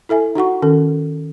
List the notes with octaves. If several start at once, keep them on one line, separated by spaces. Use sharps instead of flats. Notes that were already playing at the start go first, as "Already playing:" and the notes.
E4 A4 E5 G#5
D#4 F#4 F#5 C#6
D#3 C#4 A4